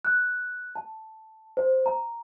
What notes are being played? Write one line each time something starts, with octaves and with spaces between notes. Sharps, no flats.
F#6
A5
C5
A#5